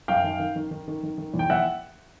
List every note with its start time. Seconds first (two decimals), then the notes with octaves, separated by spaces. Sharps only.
0.08 F#2 F5 G5
0.24 D#3
0.39 D#3
0.56 D#3
0.71 D#3
0.88 D#3
1.03 D#3
1.18 D#3
1.34 E2
1.39 G5
1.50 E2 E5 F#5